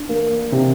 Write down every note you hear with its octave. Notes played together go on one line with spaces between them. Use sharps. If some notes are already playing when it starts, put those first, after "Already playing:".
Already playing: D4
A#3
C3